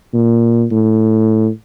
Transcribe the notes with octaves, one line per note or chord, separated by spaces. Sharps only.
A#2
A2